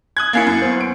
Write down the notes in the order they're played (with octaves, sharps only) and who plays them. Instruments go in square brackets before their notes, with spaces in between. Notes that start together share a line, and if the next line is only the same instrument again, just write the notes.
[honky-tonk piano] D#6 F#6 G#6
[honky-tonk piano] A#3 C#4 E4 [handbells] A6 C7 C#7
[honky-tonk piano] F#2
[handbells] B3 C5
[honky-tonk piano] D7